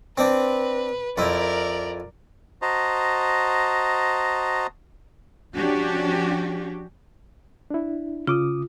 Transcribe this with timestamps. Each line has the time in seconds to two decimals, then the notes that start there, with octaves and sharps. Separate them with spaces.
0.18 C4 D4 B4
1.18 F2 E4 A#4 D5
2.62 F#4 C5 D#5 A5 A#5
5.55 F3 C#4 D4 F#4 G4
7.70 D4 E4
8.27 C#3 F4 D6 D#6